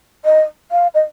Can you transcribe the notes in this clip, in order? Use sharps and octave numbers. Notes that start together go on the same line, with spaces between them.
D#5
F5
D#5